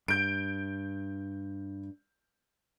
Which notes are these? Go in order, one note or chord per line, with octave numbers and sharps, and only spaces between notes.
G2 G6 D7